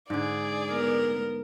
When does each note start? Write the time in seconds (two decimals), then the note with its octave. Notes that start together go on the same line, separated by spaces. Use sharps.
0.10 G#2 D3 G#4 D5
0.71 B3 A#4